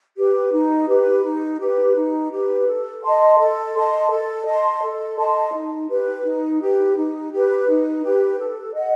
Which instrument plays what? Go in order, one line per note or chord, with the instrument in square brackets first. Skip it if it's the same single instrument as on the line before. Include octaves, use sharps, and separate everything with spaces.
[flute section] G4 B4
D#4
G4 B4
D#4
G4 B4
D#4
G4 B4
A4
D#5 A5 C6
A4
D#5 A5 C6
A4
D#5 A5 C6
A4
D#5 A5 C6
D#4
G4 B4
D#4
G4 B4
D#4
G4 B4
D#4
G4 B4
A4
D#5 F#5